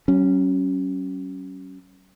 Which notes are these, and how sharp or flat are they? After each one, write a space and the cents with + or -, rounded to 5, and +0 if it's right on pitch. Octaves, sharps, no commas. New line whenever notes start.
F#3 +40 C#4 +0